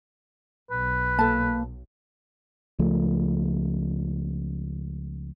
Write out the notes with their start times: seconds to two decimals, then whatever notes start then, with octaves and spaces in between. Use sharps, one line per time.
0.71 B1 B4
1.19 A#3 A4 A5
2.79 C#2 F3 A3